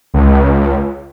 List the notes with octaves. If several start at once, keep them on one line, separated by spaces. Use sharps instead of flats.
C#2